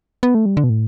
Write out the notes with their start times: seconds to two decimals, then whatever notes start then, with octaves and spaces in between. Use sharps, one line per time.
0.23 B3
0.35 A3
0.46 G3
0.57 D3
0.64 B2
0.70 A2